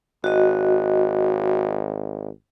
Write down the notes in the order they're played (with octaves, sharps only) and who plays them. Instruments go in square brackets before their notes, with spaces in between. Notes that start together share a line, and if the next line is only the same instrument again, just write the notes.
[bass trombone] G#1 [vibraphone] F#4 D#5